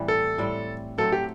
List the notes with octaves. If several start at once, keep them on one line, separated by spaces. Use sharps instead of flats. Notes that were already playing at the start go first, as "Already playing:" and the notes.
Already playing: A2 E3 G3 C4
A4
A2 G3 C4
F#3 A3 C4 A4
G4